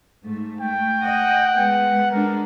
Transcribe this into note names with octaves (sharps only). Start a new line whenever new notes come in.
G#2 A3
A3 G5
D#5 F#5
G#3 B3
G#3 D4 A#4